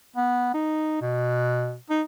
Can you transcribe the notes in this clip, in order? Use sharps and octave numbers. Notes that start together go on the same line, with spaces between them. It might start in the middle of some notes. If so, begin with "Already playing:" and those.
B3
D#4
B2
D#4